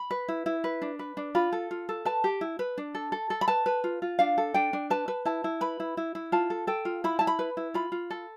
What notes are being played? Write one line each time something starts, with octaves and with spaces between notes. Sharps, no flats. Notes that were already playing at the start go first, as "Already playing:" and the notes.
Already playing: B5
B4
E4
E4
B4
D4
B4
D4
F4 B5
A4
F4
A4
B4 A5
G4
E4
B4
D4
A4
A4
A4
B5
B4 A5
B4
F4
F4
D4 F5
A4
D4 G5
D4
B4 A5
B4
E4 A5
E4
B4 B5
E4
E4
E4
F4 A5
A4
A4 G5
F4
E4 B5
E4 A5
B5
B4
E4
F4 B5
F4
A4